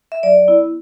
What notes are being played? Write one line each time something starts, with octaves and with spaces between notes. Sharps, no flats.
E5
F#3 D5
B3 E4